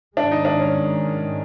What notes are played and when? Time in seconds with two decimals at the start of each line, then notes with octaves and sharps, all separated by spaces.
0.17 G#2 D#3 G#3 D4
0.31 D#4
0.45 D4
0.59 C#4